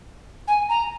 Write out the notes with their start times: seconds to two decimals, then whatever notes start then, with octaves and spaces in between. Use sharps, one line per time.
0.48 G#5
0.69 A#5